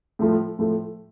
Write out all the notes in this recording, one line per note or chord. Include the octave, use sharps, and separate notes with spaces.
A2 F3 A3
A2 F3 A3